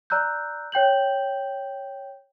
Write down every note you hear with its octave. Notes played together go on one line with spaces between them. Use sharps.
D5 A#5 E6 F#6 G6
C#5 G5 G6 F#7